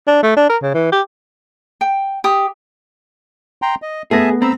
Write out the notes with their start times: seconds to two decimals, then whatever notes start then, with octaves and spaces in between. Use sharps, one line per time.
0.07 D4
0.23 A3
0.36 D4
0.49 A#4
0.62 C#3
0.74 E3
0.92 G4
1.81 G5
2.24 G4 D#6
3.62 G5 A#5 C6
3.82 D#5
4.11 A3 B3 G#4 E5 G#5 A5 A#6
4.42 C4 A#5 B5 E6